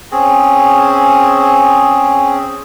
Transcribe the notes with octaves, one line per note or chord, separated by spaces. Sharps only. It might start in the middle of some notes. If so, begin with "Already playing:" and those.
C4 C#4 G#4